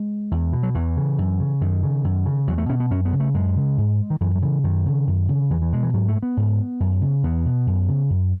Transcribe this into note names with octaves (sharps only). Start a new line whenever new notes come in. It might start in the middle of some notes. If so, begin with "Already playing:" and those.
Already playing: G#3
E2
B2
F#3
E2 E3
C#3
F#2
C#3
F#2 D#3
C#3
F#2
C#3
E2 F#3
A3
B2 C#4
B3
F#2 C#4
B3
C#3
A3
F#2 G#3
C#3
G#2
D#3
F#2 E3
F#3
C#3 E3
F#2 D#3
C#3
F#2
C#3
E2 E3
E3
B2 G#3
E3
G#2 F#3
A3
B3
G#2
F#2
C#3
E2 B3
B2
F#2
C#3
F#2